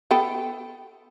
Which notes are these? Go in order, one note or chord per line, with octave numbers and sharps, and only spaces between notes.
B3 A4 G5